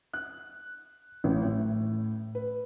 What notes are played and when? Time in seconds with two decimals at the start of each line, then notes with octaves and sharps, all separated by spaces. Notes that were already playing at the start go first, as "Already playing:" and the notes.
0.13 F#6
1.24 A1
1.44 A2
2.35 B4